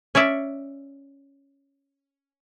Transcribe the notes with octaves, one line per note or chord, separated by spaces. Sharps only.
C#4 C#5 D5 E5